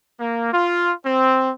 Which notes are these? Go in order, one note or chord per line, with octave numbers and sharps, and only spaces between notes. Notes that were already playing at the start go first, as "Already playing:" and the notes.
A#3
F4
C4